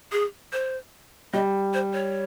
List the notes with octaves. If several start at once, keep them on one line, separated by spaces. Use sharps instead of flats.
G#4
C5
G3 D#5
C5
C#5